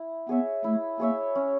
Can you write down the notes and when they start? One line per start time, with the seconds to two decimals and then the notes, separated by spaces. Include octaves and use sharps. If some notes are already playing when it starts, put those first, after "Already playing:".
Already playing: E4
0.29 B3 G#4 C#5 E5
0.64 A3 E4
0.99 A#3 G#4 C#5 E5
1.35 C#4